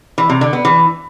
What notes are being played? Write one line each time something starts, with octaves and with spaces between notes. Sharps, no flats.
E3
C3
D3
B3
E3